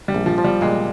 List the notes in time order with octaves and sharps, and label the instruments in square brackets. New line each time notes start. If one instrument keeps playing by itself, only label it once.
[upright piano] G3
[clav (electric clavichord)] A#1
[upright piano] F3
[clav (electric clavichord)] F3
[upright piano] G3
[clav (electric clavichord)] A#2 [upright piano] G#3